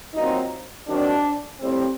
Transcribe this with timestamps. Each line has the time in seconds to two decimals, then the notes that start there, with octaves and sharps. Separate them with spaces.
0.15 A#2 F#3 C4 D#4
0.87 D#3 F#3 C4 D4
1.60 A2 G3 C4